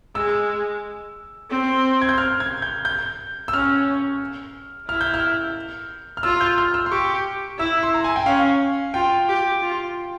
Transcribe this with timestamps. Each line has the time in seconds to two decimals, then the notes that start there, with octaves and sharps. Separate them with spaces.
0.15 G#3 E6
1.50 C4
2.02 G#6
2.09 G6
2.18 F6
2.40 G#6
2.62 G6
2.85 G6
3.48 E6
3.52 C#4 F6
4.88 E4 F6
5.01 G6
5.14 F6
6.17 F6
6.23 F4 E6
6.41 G6
6.58 F6
6.74 E6
6.86 C6
6.91 G4 C#6
7.58 E4 E6
7.83 C6
7.94 A#5
8.04 G#5
8.16 G5
8.26 C#4 F5
8.94 F4 G5
9.28 G4
9.62 F4